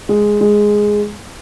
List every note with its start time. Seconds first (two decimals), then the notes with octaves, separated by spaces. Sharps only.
0.09 G#3
0.41 G#3